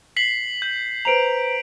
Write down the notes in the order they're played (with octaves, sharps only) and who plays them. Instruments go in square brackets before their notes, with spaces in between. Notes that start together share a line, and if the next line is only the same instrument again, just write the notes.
[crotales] B6 C7 F#7
G6
[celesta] B4 C5 A#5 [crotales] D7 F7